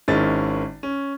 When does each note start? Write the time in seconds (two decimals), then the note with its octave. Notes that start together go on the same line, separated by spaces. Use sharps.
0.08 G#1 D#3 G#3 C#4 E4 A6
0.83 C#4